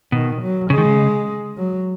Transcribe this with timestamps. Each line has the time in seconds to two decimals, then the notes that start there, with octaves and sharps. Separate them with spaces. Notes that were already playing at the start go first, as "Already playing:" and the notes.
0.12 B2 D#3
0.41 F#3
0.70 C#3 G#3
0.78 D#3
0.85 C#3
1.57 F#3